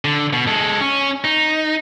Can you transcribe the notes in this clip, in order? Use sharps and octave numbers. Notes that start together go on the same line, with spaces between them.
D3
B2
G#3 A4
C#4
D#4